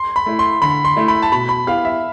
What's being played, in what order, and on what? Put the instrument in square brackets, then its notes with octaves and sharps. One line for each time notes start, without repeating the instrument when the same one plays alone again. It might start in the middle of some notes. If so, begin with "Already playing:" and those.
Already playing: [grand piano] C6
B5
[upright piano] A3 E4
[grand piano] C6
[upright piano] D3 [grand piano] B5
[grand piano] C6
[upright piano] A3 E4
[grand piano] B5
A5
[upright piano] B2 [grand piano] B5
[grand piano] B5
[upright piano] B3 E4 G4 [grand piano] F5
[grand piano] E5